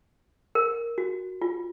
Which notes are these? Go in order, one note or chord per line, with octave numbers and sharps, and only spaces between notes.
A#4
F#4
F4